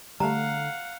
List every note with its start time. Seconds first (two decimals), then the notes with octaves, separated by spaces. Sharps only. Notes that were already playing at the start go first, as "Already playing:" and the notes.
0.20 D3 G3 A3 F5 F#5 A#5